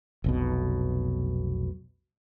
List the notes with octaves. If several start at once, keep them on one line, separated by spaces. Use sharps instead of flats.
F1 B1 B2